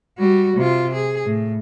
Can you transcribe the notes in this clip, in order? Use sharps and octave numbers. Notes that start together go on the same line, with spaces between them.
G3 F#4
C3 F4
G#4
A2